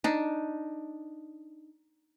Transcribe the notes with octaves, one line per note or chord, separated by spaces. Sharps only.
D4 D#4